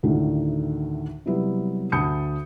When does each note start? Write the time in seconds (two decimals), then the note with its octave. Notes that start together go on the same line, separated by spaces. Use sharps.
0.03 D2 A2 D3 D#3 A3
1.26 C3 F#3 G3 B3 E4
1.92 D2 A5 B5 D#6 G6 C#7